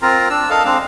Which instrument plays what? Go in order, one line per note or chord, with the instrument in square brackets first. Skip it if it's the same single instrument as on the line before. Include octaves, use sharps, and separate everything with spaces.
[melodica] C4 F4 A#4 A#5
D4 E6
A4 A#4 D#5 F5
G#3 C4 D4 F5